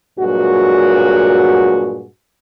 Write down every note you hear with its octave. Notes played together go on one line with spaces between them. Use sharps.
G2 A#2 F#3 G#3 F#4